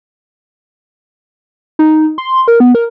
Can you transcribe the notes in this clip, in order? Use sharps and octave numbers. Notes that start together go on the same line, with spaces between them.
D#4
C6
A#4
B3
A#4